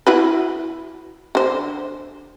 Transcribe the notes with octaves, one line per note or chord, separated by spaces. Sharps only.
E4 F#4 B4
D3 C5